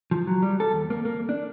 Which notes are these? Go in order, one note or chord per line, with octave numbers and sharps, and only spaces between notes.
F3
F#3
G3
A4
D#2
A#3
A#3
D4